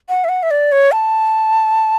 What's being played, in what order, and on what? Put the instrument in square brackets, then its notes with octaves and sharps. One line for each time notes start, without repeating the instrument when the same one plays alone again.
[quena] F#5
E5
F#5
E5
D5
C#5
A5